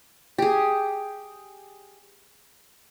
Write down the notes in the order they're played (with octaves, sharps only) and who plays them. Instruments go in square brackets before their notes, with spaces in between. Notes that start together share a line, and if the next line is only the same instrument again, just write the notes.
[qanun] G4 G#4